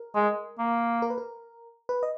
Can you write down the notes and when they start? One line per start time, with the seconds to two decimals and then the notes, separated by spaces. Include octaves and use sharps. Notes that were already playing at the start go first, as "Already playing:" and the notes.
Already playing: A#4
0.15 G#3
0.59 A#3
1.02 A#4
1.10 B4
1.18 A#4
1.89 B4
2.03 D#5